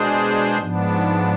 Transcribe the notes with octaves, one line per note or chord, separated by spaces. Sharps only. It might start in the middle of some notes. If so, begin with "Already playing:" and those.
Already playing: B2 G#3 D4 G#4 C5
G#2 F3 B3 D4